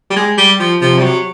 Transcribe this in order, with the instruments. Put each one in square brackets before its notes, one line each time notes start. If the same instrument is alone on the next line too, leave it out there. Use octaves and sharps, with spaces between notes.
[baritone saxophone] G3
G#3
G3
F3
[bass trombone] C3 [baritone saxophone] F3
[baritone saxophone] G3
F#3